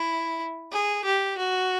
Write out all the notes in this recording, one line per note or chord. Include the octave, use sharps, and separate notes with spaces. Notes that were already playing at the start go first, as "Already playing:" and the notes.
Already playing: E4
G#4
G4
F#4